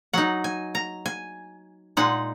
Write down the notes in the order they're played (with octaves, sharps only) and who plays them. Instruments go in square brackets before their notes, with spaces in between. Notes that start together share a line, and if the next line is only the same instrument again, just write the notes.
[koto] F#3 D#4 F#5
G#5
A#5
G#5
A#2 G#3 D#4 F#5